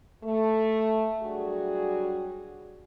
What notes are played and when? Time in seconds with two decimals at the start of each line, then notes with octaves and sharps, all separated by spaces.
0.24 A3
1.22 F#3 G3 D4 F#4 G#4